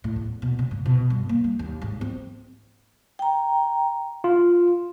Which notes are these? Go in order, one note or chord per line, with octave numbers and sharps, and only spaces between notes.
A2
E2
B2
C#3
G#2
B2
G2
A#3
G3
D#2
G#1
C4
G5 A#5
F4